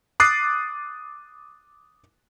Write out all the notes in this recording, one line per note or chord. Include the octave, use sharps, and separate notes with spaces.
D6 D#6 F#6 A6 C7